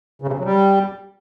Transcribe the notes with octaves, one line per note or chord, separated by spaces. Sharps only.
C#3
C3
C#3
F#3
G3